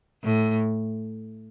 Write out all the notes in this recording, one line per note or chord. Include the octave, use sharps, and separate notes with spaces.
A2